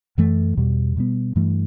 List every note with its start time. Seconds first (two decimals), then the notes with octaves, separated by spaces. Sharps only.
0.18 F#2 E3 A3
0.57 E2 B2 G3
0.97 B2 G3 B3
1.36 G2 E3 A3